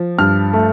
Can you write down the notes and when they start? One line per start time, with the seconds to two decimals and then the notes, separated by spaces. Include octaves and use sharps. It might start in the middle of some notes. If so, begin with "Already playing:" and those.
Already playing: F3
0.18 G2 F6
0.53 A3